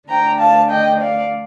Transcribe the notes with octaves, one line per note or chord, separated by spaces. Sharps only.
D3 A3 D4 G5 A#5
F5 A5
D#5 G5
D5 F5